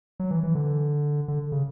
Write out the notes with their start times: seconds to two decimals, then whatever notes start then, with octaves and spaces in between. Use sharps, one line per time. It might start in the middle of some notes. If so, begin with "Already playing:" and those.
0.20 F#3
0.31 E3
0.43 E3
0.55 D3
1.28 D3
1.52 C#3